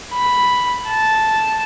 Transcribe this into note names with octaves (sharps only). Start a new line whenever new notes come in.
B5
A5